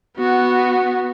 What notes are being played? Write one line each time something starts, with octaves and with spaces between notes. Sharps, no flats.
B3 F#4